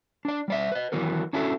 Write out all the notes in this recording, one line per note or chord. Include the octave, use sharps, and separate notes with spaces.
D4 D5
G3 D5 E5
B4 D#5
D#3 E3 F#3 B3 A#4
C#4 D4 E4 F#4 A4 D5